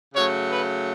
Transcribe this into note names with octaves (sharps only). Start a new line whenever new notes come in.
C#3 F#3 A3 C#5
B4